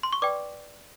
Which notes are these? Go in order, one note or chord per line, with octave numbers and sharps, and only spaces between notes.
C6
C#6
B4 D5 G5 D6